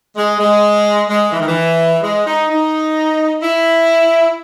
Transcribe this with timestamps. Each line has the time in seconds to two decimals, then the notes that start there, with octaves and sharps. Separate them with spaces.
0.16 G#3
0.39 G#3
1.09 G#3
1.32 E3
1.40 D#3
1.48 E3
2.02 G#3
2.27 D#4
2.49 D#4
3.43 E4